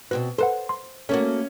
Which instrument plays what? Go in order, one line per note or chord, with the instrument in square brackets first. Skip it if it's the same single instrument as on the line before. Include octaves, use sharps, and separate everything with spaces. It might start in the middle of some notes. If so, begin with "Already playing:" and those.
[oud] B2 C4 F#4 [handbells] B4
[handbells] A4 B4 F#5 [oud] C5
[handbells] C6
[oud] A3 A#3 F#4 [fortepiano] C#4